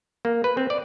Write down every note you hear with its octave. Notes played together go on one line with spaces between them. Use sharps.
A#3
B4
C4
D5